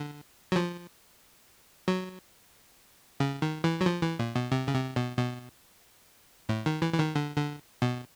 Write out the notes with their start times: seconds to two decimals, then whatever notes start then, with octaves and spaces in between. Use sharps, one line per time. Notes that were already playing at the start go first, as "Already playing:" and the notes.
Already playing: D3
0.52 F#3
0.56 F3
1.88 F#3
3.20 C#3
3.42 D#3
3.64 E3
3.81 F#3
3.86 F3
4.02 E3
4.19 A#2
4.35 B2
4.52 C3
4.68 C#3
4.74 C3
4.96 B2
5.18 B2
6.49 A2
6.66 D#3
6.82 E3
6.93 E3
6.99 D#3
7.15 D3
7.37 D3
7.82 B2